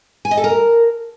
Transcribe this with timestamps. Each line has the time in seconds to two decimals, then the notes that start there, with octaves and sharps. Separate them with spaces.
0.25 G#5
0.31 D#5
0.37 A4
0.44 A#4